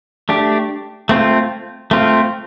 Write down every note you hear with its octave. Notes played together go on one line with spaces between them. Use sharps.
A3 D4 G4
A3 C4 F4
A3 C4 F4